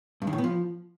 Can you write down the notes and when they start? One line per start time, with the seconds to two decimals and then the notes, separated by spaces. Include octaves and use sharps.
0.22 G2
0.27 D#3
0.33 A2
0.38 B3
0.44 F3